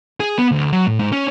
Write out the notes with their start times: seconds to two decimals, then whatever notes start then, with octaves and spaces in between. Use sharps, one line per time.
0.20 G#4
0.38 B3
0.52 D2
0.72 F#3
0.87 A2
0.99 G#2
1.12 C#4